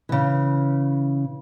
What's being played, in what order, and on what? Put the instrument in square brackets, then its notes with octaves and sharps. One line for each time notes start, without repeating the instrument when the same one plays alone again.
[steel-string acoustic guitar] C#3 E3